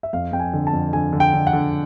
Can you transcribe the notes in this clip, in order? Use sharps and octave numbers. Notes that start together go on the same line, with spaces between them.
E5
F2 F5
F2 G5
G#5
D3
A5
F2
D3 G#5
D3
G5
D3
F#5
D3